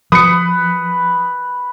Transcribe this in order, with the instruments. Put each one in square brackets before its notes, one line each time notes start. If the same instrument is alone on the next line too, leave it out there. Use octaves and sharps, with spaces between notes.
[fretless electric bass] F3 [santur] B4 [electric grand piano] D#6 C#7